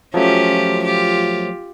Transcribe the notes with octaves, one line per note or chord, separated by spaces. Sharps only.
F3 F#3 A3 C#4 F4 G4
F4 G4